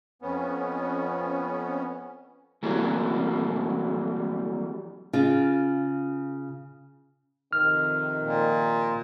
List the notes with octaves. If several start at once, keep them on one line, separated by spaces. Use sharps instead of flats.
F2 B3 C#4
E3 F#3 G3 A3 A#3 C4
C#3 F4
F2 C3 D#3 F6
A#2